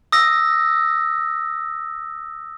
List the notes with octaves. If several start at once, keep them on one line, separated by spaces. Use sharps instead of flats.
D#6 E6 A#6